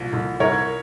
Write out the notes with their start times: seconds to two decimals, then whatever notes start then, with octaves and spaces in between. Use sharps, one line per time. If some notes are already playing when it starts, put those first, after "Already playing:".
Already playing: C2 A#2 F3
0.13 C2
0.40 C2 A#4 C#5